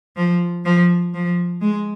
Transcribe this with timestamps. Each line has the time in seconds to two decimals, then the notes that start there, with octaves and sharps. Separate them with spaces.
0.17 F3
0.65 F3
1.14 F3
1.61 G#3